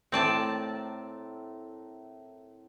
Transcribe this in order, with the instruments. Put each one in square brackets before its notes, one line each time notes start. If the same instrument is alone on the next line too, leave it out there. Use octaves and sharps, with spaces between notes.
[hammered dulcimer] A2 A#4 A#5 [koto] C4 D5 A5